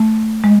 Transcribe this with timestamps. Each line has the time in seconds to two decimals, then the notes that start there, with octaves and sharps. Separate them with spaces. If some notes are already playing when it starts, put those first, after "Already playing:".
Already playing: A3
0.44 G#3